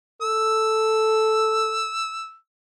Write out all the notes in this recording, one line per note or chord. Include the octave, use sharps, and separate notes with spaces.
A4 E6